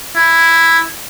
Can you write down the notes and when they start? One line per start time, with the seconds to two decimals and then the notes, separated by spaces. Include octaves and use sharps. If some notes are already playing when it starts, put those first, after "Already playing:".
0.16 E4